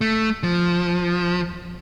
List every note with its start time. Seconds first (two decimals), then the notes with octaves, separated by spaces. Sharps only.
0.01 A3
0.43 F3